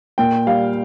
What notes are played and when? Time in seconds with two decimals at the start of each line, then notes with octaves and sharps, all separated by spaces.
0.18 A#2 G5
0.47 G3 F5